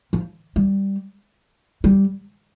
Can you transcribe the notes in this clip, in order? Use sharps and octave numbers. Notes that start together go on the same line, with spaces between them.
F3
G3
G3